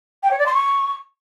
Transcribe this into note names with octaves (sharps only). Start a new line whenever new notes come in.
G5
C#5
D5
C6
C#6